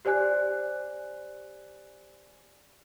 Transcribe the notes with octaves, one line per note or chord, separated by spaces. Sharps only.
G4 C5 D5 G#5 F#6